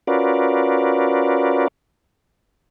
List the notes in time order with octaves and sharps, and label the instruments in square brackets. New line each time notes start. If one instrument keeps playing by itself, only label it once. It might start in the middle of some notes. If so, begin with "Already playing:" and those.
[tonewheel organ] C#4 F4 F#4 A#4 B4 D5